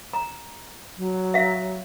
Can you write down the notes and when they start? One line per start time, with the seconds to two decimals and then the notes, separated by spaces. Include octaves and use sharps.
0.13 A#5
0.97 F#3
1.34 E5 F5